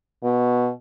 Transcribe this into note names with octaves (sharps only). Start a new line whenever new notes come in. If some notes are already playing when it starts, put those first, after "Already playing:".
B2